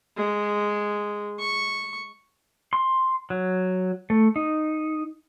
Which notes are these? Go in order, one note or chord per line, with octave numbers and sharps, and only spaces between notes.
G#3
C#6
C6
F#3
A3
D#4